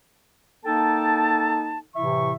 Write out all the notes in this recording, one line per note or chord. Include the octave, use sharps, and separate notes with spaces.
A#3 D#4 A4 G5 A5
A2 C3 E3 E4 E5 C#6